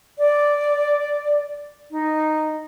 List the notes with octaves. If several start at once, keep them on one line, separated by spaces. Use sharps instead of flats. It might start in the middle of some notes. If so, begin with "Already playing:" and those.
D5
D#4